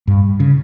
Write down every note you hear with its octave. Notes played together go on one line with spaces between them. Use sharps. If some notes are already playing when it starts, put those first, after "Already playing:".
G2
C#3